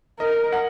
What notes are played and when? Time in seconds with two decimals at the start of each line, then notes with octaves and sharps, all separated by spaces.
0.19 A#4 D#5
0.52 F#5